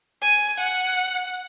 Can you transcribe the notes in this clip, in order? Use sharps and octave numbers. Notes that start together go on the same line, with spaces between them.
G#5
F#5